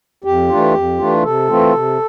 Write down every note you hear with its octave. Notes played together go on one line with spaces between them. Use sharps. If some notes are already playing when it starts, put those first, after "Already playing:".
F2 G4
E3 A3 D4 F4
F2
E3 A3 D4 F4
C3 A4
E3 A3 C4 F4
C3